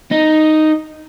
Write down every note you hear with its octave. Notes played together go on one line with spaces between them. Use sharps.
D#4